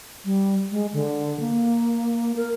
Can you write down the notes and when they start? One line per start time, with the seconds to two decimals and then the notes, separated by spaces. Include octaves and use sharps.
0.25 G3
0.71 G#3
0.93 D3
1.40 A#3
2.36 A#4